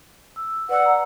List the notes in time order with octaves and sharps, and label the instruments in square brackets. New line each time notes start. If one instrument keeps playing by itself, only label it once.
[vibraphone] E6
[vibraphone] B4 D5 E6 [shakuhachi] F#5
[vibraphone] A#5